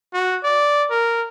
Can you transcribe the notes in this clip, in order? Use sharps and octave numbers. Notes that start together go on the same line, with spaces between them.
F#4
D5
A#4